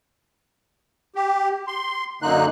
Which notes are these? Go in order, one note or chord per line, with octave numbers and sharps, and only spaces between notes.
G4
C6
F#2 D3 A#3 D#4 F#6